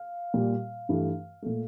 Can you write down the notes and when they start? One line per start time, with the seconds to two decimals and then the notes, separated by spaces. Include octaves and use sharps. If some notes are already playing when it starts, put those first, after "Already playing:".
Already playing: F5
0.34 A#2 G3
0.89 G2 E3 A3
1.42 A#2 A3